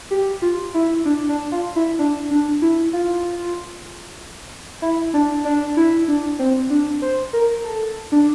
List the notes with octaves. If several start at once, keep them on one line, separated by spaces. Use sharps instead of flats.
G4
F4
E4
D4
D4
F4
E4
D4
D4
E4
F4
E4
D4
D4
E4
D4
C4
D4
C5
A#4
A4
D4